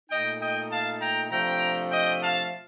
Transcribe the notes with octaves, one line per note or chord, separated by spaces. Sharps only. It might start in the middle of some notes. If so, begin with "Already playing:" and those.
A#2 A3 D#4 D#5 G5
D#5 G5
F5 A5
G5 A#5
C3 F3 A3 D4 G5 A#5
D#5 G5
F5 A5